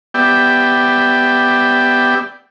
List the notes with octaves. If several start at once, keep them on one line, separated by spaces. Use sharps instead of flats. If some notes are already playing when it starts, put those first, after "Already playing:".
B3 G4 D5 E5 G5